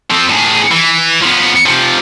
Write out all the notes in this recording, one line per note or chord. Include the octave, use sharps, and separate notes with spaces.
F3 C4
A2 G#4
E3
F3 B3
C3 F3